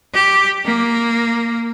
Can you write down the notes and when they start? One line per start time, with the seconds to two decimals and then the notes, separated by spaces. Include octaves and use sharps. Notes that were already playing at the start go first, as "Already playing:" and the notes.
0.14 G4
0.64 A#3